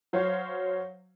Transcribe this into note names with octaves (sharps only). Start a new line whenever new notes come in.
F#3 C5 C#5 F5